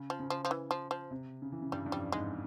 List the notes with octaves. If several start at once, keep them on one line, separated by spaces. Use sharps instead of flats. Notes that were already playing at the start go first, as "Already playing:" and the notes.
Already playing: C#3
F3
C#3
F3
F3
E3
F3
F3
C3
C#3
E3
C#3
G2 G3
G2
F2 G3
G#2 G#3